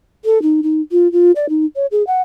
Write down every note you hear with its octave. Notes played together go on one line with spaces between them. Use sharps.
A4
D#4
D#4
F4
F4
D5
D#4
C#5
G#4
F#5